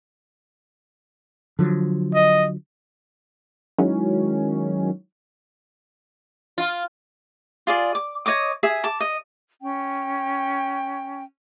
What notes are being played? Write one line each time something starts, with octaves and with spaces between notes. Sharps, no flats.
D3 F3 F#3
D#5
D#3 F#3 G#3 C#4 E4
F4
F4 G#4 D5
D6
C#5 D#5 D6 D#6
G#4 E5 D#6
A5 D6
D#5
C#4 G5